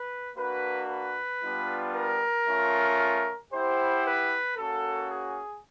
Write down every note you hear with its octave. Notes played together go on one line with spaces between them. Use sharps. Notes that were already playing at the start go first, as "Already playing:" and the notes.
Already playing: B4
A#3 D4 F#4 B4
B4
G3 B3 D4 F4
A#4
A3 C#4 F4
B3 E4 G4 C5
B4
A#3 C#4 F#4 A4
G#4